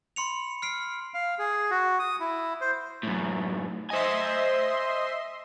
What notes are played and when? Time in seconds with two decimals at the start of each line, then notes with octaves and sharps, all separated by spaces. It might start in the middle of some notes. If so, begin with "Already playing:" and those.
0.16 B5 C6 C#7 F7
0.62 F6 C7 D7
1.14 F5
1.39 G#4
1.71 F#4
1.99 D#6
2.20 E4
2.61 C5
3.03 F#2 A2
3.90 C5 D#5 E5 G#5 C6